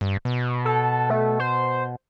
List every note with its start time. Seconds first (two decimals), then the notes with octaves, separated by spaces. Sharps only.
0.01 G2
0.25 B2
0.65 A4
1.10 A3
1.40 C5